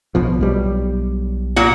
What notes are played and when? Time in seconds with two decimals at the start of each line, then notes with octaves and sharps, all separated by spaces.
0.15 B1 B2 F3
0.41 B1 G3
1.56 A#2 F#4